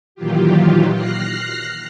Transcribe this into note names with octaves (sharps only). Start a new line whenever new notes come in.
A#2 D#3 E3 F#3 F4 G4
F6 F#6 A#6 C7